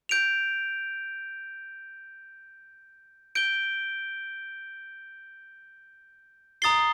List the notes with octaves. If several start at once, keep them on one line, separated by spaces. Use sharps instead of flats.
G6 D7 F7
G6 D7 G7
A#5 D#6 A6 C7 G7